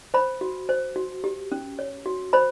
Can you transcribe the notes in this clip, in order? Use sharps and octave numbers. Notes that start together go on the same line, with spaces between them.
C5 B5
F#4
C5
F#4
G4
C#4
C#5
F#4
C5 B5